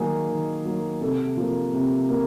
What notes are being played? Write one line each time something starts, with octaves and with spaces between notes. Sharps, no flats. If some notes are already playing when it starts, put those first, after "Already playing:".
Already playing: D#3 F#3 A#3 G#4
D#3
F#3 A#3
C3 A4
F3 A#3
C3
F3 A#3